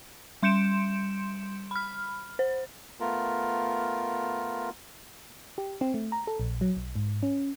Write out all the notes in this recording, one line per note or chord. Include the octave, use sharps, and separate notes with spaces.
G3 C6 G6 C#7 D7 E7
B5 F6
C5
A3 B3 F4 A#4
G4
C4
A3
A#5
A4
A#1
F#3
B1
G#2
C#4